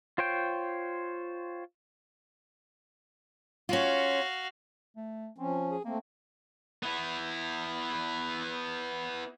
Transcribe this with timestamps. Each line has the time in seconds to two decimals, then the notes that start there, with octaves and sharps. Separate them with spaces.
0.18 F4 C5 C#5 G5
3.69 C#4 F4 F#4 F5
4.96 A3
5.38 F3 C4 C#4
5.70 G#4
5.85 A3 A#3 C4
6.83 B3 E4